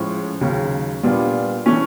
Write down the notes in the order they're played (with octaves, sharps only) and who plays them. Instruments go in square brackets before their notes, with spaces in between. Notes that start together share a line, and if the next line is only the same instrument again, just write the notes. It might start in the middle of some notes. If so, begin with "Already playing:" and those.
Already playing: [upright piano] A2 F3 G#3 C#4
D#2 C#3 F#3
A#2 G3 B3 D4 F4
E3 A3 C#4